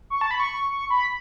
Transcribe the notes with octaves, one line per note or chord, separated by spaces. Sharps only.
C#6
A5
B5
C#6
C#6
B5